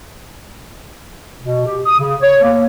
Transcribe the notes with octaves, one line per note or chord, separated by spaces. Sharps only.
B2
G4
D#6
C#3
C#5
A#3